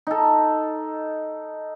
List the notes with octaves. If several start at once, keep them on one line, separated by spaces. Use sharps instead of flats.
D#4 A4